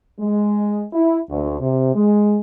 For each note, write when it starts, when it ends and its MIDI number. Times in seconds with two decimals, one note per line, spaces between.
0.20 0.84 56
0.93 1.18 64
1.29 1.57 38
1.61 1.93 48
1.95 2.39 56